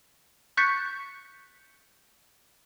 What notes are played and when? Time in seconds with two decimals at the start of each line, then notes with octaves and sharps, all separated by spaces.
0.57 C#6 F#6 G6 A6 B6 C#7